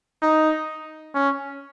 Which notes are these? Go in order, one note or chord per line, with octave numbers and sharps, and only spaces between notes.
D#4
C#4